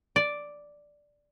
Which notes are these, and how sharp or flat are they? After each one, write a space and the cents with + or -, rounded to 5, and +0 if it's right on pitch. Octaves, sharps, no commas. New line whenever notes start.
D5 +0